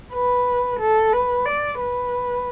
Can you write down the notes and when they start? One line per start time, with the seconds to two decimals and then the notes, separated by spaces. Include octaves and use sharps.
0.13 B4
0.80 A4
1.13 B4
1.46 D5
1.80 B4